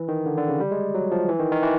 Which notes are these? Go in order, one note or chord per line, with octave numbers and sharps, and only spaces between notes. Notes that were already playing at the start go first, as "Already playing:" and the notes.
Already playing: E3
D#3
D3
D3
C#3
G3
G#3
F#3
F3
E3
D#3
D#3
E3